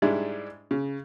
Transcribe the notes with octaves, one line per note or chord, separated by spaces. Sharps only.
G#2 G3 G#3 D4 E4
C#3